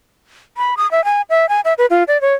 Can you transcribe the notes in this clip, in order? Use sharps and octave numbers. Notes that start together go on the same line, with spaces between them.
B5
D#6
E5
G#5
E5
G#5
E5
B4
F4
D5
C#5